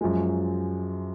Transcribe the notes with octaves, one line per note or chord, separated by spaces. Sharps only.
F#2 F3 G#3